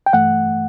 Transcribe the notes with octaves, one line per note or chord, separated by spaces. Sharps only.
G5
G2 E3 A3 F#5